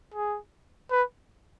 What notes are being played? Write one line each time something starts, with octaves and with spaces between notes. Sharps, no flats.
G#4
B4